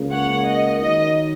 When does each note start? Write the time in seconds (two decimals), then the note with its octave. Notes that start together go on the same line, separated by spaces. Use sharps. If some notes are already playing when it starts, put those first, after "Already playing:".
Already playing: C#2 C#3 A#3
0.12 C#5 F#5
0.46 D#5
0.79 D#3 F#3 D#4 D#5